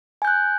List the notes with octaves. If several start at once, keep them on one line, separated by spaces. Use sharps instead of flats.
G#5 F#6 G6